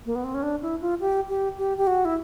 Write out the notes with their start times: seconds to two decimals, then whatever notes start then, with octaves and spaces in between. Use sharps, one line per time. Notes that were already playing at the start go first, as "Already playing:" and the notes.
0.06 A#3
0.15 B3
0.24 C4
0.34 C#4
0.42 D4
0.62 E4
0.81 F4
1.00 G4
1.28 G4
1.58 G4
1.78 G4
1.87 F#4
2.05 E4